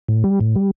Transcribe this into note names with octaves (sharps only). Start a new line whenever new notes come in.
A2
G3
A2
G3